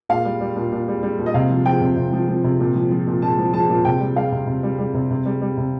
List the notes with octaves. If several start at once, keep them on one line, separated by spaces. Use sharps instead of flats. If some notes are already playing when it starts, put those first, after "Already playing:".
A#2 F5
G3
G3
A#2
A#2
G3
G3
A#2
D#5
C3 F5
F3
F3 G5
C3
C3
F3
F3
C3
A#2
F3
F3
A#2
A#2 A5
F3
F3 A5
A#2
C3 G5
G3
G3 F5
C3
C3
G3
G3
C3
C3
G3
G3
C3